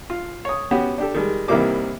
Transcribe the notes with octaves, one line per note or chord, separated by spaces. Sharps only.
F4
C#5 D#6
B3 C#4 F#4 G4
D4 G4 A4
D#3 G3 G#3
C2 D#3 E3 G3 A#3 D6